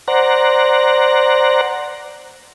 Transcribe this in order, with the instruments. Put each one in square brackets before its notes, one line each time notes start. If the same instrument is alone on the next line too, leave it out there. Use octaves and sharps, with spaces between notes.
[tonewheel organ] C5 D5 F#5 A#5